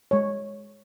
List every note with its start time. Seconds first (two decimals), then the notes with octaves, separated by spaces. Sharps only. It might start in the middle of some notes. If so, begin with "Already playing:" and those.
0.11 G#3 C#5